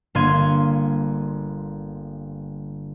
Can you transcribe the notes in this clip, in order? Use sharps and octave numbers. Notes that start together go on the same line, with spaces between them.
G1 A#3 C6 G#6 D#7